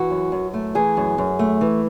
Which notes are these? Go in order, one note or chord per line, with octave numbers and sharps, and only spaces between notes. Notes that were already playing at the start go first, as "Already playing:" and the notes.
Already playing: E3 F#4
F#2
F#2
A3
E3 G#4
F#2
F#2
A3
E3